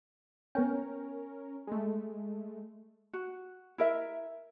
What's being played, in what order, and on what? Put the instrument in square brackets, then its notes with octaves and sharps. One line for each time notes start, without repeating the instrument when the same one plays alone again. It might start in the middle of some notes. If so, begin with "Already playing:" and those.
[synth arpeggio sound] B3 G5 [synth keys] C#4 A#4
[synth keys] G#3 A3
[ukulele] F#4
E4 A#4 E5